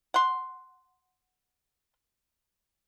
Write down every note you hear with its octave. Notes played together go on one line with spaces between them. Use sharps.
F#5 C6